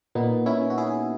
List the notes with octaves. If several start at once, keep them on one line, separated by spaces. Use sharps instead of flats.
A#2 B3 D#4
C#4 E4
F#4
E4 G#4